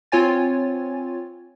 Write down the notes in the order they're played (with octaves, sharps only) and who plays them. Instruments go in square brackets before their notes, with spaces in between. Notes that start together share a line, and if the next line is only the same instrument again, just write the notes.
[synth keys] C4 F4 C#5 G#5 A6